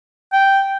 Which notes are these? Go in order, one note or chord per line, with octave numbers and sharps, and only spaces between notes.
G5